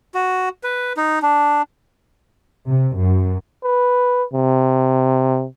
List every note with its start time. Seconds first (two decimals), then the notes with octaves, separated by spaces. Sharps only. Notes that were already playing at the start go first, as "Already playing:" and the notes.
0.14 F#4
0.64 B4
0.97 D#4
1.22 D4
2.69 C3
2.97 F#2
3.64 B4
4.33 C3